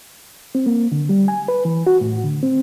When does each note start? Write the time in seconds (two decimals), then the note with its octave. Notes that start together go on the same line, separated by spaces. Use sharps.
0.55 C4
0.66 A#3
0.92 D3
1.09 G3
1.28 G#5
1.48 B4
1.65 E3
1.87 F#4
2.01 A2
2.24 D3
2.43 C4